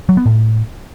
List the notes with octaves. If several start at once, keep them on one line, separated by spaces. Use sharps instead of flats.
F#3
B3
A2